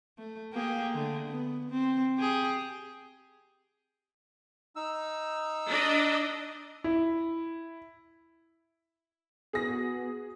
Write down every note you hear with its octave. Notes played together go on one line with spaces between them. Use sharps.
A3
A#3 G4 G#4
D3 A3
B3
C4
G4 G#4
D#4 E6
D4 D#5
E4
B3 F#4 G#4 A#6